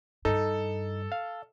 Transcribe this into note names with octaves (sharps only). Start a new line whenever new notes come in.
G2 D#4 A4
F5